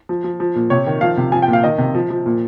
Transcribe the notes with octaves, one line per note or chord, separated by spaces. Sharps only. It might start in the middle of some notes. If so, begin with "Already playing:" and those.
F3
F3
F3
A#2
C3 C#5
D#3
F3 F5
C3
F3 G#5
G5
A#2
F5
D#3 D#5
C3
F3
F3
A#2